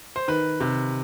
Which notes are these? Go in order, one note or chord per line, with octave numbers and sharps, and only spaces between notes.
C5
D#3 B4
C3